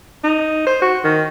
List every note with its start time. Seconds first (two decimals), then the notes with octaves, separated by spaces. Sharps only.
0.24 D#4
0.67 C5
0.82 F#4
1.04 D#3